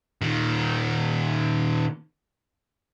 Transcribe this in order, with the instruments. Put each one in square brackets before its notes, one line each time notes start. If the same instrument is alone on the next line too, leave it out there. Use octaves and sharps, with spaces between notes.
[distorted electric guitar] A#2 D#3